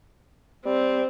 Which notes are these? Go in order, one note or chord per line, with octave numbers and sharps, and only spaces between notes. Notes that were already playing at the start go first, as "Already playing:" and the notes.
G3 C4